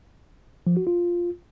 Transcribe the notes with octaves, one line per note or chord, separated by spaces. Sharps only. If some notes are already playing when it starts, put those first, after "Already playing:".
F3
F#4
F4